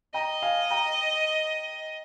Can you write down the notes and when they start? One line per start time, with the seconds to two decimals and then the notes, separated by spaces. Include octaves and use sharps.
0.14 D#5 G5 A#5
0.42 F5 G#5
0.71 G5 A#5